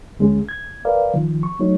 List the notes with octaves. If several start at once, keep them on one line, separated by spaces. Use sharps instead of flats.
D2 G#3 C#4 G#4
G#6
A#4 B4 D5 F5
D#3 F3
C#6
F#3 A3 D#4 C#5